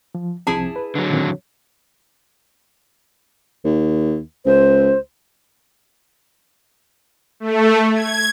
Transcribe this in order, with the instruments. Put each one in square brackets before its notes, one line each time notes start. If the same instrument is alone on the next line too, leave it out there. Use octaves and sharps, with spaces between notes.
[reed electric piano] F3
[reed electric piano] C2 F3 C4 [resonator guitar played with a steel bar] E4 G#4 A5
[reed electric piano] B4
[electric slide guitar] D3 F#3
[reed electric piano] A#2 D#3 C4
[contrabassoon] D#2
[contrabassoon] C#2 [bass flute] C5
[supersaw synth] A3
G#6